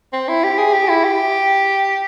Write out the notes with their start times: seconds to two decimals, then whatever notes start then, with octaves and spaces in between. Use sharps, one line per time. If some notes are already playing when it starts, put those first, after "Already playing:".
0.13 C4
0.28 E4
0.44 G4
0.58 G#4
0.73 G4
0.89 E4
1.04 G4